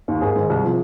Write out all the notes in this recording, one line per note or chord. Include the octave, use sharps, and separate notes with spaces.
D#2 D#3
G#1 G#4
G#2 D#3
C2
C3 F3